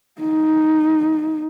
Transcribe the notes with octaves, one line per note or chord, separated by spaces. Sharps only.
D#4